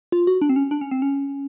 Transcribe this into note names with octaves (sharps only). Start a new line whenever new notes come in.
F4
F#4
D4
C4
C#4
D4
C#4
C4
C#4